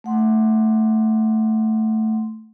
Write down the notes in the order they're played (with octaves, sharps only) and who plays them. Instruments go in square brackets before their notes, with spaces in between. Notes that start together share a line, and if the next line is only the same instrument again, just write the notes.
[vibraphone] A3 F#5 C6